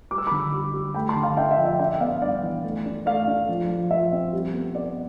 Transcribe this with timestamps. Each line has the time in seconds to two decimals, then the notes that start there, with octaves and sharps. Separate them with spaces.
0.11 G3 D6
0.18 E6
0.27 D3 B5 D6
0.52 G3
0.74 G3
0.94 A3 G5 B5
1.09 A5 C6
1.16 D3
1.23 F5 A5
1.37 D4 E5 G5
1.51 E5 G5
1.58 F3
1.65 E5 G5
1.79 D4 E5 G5
2.00 B3 D5 F5
2.22 G2 D5 F5
2.43 E3
2.64 A3
2.86 D4
3.06 A3 D5 F5
3.27 D4
3.49 F3
3.69 F3
3.91 F3 E5
4.12 C4
4.33 G3
4.53 B3
4.75 B3 D5